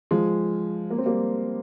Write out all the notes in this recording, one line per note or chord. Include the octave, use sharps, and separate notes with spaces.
F3 G#3
A#3
C4
G3 A#3